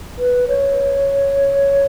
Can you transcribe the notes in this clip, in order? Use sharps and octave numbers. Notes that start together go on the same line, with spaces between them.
B4
C#5